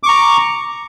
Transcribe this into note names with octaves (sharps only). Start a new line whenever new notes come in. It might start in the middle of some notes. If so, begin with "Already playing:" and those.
A#5 C#6 D6